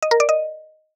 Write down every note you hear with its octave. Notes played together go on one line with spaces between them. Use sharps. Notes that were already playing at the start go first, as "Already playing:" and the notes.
D#5
A#4
D5
D#5